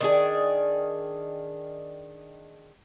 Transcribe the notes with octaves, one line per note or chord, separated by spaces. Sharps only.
D#3 D4 G#4